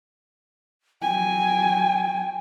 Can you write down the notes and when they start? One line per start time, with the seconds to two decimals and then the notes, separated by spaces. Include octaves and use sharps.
1.02 F#3 G5 G#5